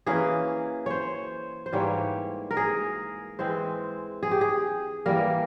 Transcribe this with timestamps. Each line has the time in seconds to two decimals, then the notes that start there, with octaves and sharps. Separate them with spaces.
0.06 E3 A#3 C#4 G#4
0.86 C5 C#5
1.66 C5
1.73 G#2 E3 G3 A#3 C#5
2.51 A#4
2.57 G#4
3.39 E3 G#3 C4 C5
4.23 G#4
4.31 G4
4.41 G#4
5.06 E3 G3 A#3 A#4